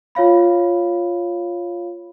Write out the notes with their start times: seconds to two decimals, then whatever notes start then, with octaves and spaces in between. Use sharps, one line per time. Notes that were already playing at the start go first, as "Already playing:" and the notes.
0.15 F4 C#5 F5 B5